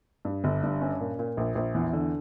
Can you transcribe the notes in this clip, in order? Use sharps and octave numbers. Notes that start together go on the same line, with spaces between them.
G2
G1
G2
C#4
A#2
A#2
A#1
A#1
E2
D3